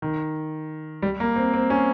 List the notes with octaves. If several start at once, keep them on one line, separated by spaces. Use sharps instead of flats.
D#3
G3
A#3
C4
C4
C#4